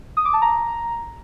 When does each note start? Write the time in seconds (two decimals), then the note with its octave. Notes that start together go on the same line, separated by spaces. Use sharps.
0.17 D#6
0.25 D6
0.33 A5
0.42 A#5